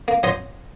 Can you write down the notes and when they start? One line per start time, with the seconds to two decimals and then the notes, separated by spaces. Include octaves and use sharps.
0.08 A#3
0.23 F#3 C5 D#5